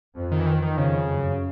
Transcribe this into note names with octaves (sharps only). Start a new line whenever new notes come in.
F2
D#3
E3
D#3
D#3
F2 C#3
F#2